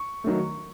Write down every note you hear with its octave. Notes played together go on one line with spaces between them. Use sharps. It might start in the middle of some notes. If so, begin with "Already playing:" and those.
Already playing: C#6
D#3 F#3 A3